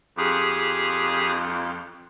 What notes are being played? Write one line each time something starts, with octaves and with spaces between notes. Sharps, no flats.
F2 G4 G#4